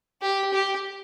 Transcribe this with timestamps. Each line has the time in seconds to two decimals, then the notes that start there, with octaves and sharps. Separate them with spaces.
0.21 G4
0.53 G4